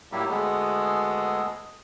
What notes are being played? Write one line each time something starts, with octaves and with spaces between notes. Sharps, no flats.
A2 F#3 G3 A#3 E4 G4
D2 G#3 B3 G#4 A4